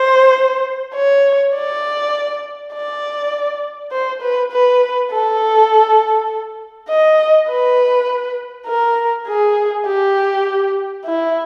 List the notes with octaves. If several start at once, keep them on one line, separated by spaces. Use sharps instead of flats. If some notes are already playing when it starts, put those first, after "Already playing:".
Already playing: C5
C#5
D5
D5
C5
B4
B4
A4
D#5
B4
A#4
G#4
G4
E4